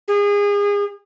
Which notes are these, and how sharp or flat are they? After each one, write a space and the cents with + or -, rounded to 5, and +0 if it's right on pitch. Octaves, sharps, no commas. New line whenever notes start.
G#4 -30